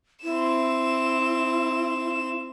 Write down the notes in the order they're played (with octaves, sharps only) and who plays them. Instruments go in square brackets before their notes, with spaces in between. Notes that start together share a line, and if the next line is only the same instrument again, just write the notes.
[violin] C4 E7 [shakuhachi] E4